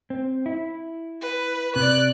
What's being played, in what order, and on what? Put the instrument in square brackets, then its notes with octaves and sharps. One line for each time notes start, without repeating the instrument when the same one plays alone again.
[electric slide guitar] C4
E4
[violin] B4
[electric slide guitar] C3 [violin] D5 F#6